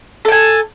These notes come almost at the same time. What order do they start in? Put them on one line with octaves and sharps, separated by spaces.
A4 G5 G#5